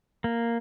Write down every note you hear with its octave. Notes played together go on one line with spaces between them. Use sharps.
A#3